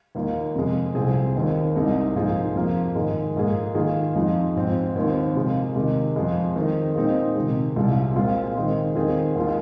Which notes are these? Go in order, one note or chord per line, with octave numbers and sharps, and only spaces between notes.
D#2 D#3 A#3 F4
F2 C3 G#3
C2 C3 F3 C4 G#4
D#2 D#3 C4
C2 C3 G#3 D#4
G#2 F3 A#3 D#4 G#4
F2 F3 A#3
G#2 D#3 G#3
G#2 F3 A#3 G#4
D#3 A#3 F4 G#4
F2 F3 G#3 D#4
G#2 F3 C4
D#2 D#3 C4
C3 F3 G#3 F4
C3 D#3 G#3
F2 F3 G#3
D#3 C4 D#4 G#4
A#2 G#3 C4 D#4
C3 D#3 G#3
C2 C3 G#3 F4
A#2 G#3 C4 F4
D#3 G#3 C4
D#3 C4 F4 G#4
D#2 D#3 G#3 F4